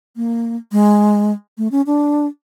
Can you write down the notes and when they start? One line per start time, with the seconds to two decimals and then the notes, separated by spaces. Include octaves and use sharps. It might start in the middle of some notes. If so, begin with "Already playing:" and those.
0.16 A#3
0.72 G#3
1.58 A3
1.72 C#4
1.87 D4